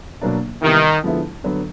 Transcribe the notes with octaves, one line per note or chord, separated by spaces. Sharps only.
B2 F#3 A#3 D4
C3 D#3 E3 G3 B3
D3 F3 G#3 B3 E4
D3 F#3 B3